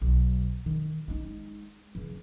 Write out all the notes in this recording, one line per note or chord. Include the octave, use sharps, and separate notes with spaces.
B1
D#3
G#3 D#4
C#3 E3